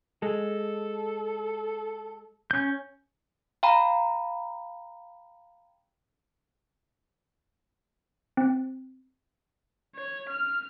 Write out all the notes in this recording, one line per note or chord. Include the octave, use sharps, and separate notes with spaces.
G#3 A4
C#4 G6
F5 G5 A#5 B5
C4
C#5
F6